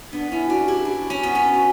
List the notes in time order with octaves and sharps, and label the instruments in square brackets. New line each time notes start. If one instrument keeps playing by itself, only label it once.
[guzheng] B3 [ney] D4
[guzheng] C#4 [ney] E4
[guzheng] D4 [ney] F#4
[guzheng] E4 [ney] G4
[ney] G4
[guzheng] D4 [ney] F#4
[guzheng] C#4
B3
C#4